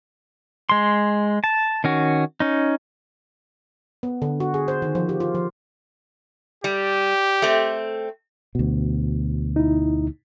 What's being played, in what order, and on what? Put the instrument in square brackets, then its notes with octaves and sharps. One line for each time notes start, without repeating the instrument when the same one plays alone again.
[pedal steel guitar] G#3 C6
A5
D#3 C#4 F#4
C#4 D#4
[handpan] B3
D3
F#4
G#4
C5
D#3
F3
G4
F4
F3
[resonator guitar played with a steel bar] G3 [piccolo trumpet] G4
[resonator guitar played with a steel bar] A3 C4
[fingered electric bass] D2 B2
[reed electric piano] D#4 E4